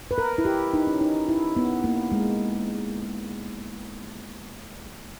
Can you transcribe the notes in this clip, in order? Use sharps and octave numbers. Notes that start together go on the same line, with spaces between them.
B4
A#4
E4
G4
D#4
C#4
D#4
E4
B3
A#3
G#3